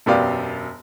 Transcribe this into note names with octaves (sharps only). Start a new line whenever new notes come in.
E1 F#2 B3 G4 D5 F5